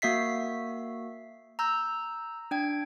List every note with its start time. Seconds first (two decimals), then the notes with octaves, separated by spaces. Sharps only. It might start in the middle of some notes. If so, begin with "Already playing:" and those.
0.02 A#3 F#4 E5 B6 C7
1.59 A#5 E6 G6
2.51 D4 G5 G#6